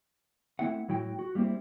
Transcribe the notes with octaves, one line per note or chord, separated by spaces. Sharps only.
A3 C4 E4 E5 F#5
A2 F#3 E4 F#4 G5
F#4
G3 A#3 C4 E4 C5